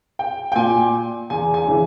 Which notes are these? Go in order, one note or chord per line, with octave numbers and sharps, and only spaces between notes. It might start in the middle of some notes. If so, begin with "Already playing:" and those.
G5
G5
A#2 G#5
E2 G#5
G#5
C#3 E3